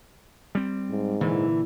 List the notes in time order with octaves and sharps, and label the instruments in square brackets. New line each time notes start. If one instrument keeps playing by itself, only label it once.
[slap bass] G3 C4
[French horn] G#2
[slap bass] A#2 D3 [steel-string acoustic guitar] E3